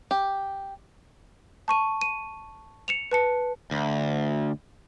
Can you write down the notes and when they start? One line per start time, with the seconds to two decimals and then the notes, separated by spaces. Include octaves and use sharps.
0.11 G4
1.68 A5 C#6 D#7
2.01 D#7
2.88 C#7 E7 F7
3.11 B4 A5 C#7
3.71 D2